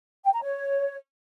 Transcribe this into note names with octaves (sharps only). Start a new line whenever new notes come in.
G5
A#5
C#5